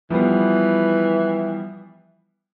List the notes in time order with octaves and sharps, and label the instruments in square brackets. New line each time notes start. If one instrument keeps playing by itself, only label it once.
[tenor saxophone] E3 [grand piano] F3 G3 B3